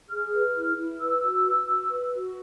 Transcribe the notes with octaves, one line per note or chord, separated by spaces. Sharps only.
G#4 F6
B4
E4
E4
B4 E6
F#4
B4
F#4
B4
F#4